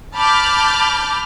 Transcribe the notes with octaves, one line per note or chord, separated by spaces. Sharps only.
A5 B5 D6 F6 G6